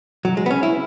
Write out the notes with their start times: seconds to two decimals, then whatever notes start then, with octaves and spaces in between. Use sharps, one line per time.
0.25 F#3
0.37 G#3
0.46 B3
0.51 C#4
0.63 E4